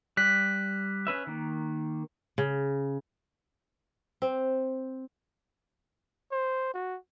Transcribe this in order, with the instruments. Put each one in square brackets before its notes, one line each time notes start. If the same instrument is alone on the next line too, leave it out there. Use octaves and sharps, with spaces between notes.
[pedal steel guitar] G3 [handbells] F#6 B6
[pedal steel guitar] C#4 B4 E5
D#3 A#3
[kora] C#3
C4
[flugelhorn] C5
F#4